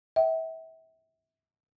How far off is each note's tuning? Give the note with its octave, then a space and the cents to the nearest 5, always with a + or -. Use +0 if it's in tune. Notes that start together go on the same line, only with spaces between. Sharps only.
E5 -30 G5 -40